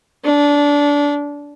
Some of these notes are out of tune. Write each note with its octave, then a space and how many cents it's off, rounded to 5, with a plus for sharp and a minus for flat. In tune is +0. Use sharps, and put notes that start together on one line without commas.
D4 -20